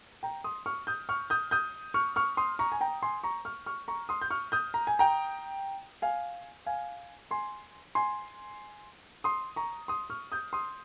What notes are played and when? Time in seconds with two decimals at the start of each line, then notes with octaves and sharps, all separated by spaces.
0.23 G5 A#5
0.44 C6 D#6
0.66 C#6 F6
0.87 D#6 G6
1.09 C#6 F6
1.30 D#6 G6
1.51 D#6 G6
1.94 C#6 F6
2.16 C#6 F6
2.37 C6 D#6
2.59 A#5 C#6
2.72 G#5
2.81 G5 A#5
3.02 G#5 C6
3.23 A#5 C#6
3.45 C#6 F6
3.66 C#6 F6
3.88 A#5 C#6
4.09 C6 D#6
4.22 G6
4.30 C#6 F6
4.52 D#6 G6
4.74 A#5
4.87 G#5
4.99 G5 A#5
6.02 F5 G#5
6.66 F5 G#5
7.31 G#5 C6
7.95 G#5 C6
9.24 C6 D#6
9.56 A#5 C#6
9.88 C6 D#6
10.10 C#6 F6
10.32 D#6 G6
10.53 C6 D#6